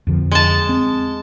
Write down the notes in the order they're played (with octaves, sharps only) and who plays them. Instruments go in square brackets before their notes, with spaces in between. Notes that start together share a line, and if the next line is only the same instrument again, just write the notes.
[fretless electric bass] F2 D3 F3
[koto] G#3 A5
[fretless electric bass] C4